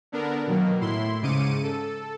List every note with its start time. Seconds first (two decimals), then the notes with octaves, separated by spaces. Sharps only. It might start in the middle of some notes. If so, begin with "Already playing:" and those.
0.12 D3 B3 D4 A#4
0.47 B2 D#3 F#3 A#3
0.81 A2 E4 C6
1.22 G#2 C#3 D6 C#7 D#7
1.63 A4